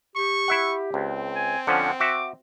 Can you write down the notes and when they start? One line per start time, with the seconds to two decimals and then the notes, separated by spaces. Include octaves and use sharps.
0.16 G4 C#6
0.48 E4 E5 F#5
0.94 C#2 C4
1.36 G#5
1.67 D3 F3 C#4 F#5
2.00 F#4 E5 D6